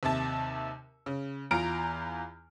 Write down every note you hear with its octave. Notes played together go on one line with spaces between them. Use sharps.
D#2 C3 E5 A5
C#3
E2 F4 A#5 F6 D7